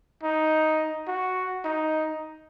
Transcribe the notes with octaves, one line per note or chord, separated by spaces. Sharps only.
D#4
F#4
D#4